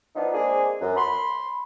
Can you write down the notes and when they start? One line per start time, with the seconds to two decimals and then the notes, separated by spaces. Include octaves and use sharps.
0.15 F3 B3 D4 D#4
0.32 G#3 A#3 C4 D4 G#4
0.80 F#2
0.96 B5 C6